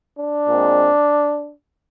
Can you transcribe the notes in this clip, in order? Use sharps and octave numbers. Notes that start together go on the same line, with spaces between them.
D4
A#2 G#3 C4